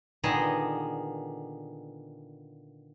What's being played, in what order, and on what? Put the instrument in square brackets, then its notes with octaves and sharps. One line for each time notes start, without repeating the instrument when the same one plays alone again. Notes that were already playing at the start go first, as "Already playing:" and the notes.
[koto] A#2 D3 D#3 B3 G#4 D#5